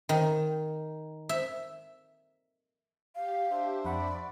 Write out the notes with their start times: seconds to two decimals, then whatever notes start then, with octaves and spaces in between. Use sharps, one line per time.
0.09 D#3
1.29 E5
3.15 G4 F5
3.51 D4 C5 E5
3.85 F2 D5 F#5 B5 C#6